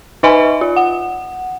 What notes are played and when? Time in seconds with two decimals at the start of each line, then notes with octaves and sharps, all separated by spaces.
0.23 D#4 B4 D#5 E5 G#5 B5
0.61 F4
0.76 F#5